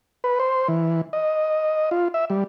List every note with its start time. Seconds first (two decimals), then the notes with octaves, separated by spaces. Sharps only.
0.24 B4
0.40 C5
0.68 E3
1.13 D#5
1.91 F4
2.14 E5
2.30 G3